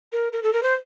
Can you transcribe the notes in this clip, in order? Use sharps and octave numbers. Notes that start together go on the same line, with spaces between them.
A#4
A#4
A4
A#4
C5